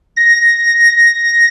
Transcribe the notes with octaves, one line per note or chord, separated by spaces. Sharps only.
A#6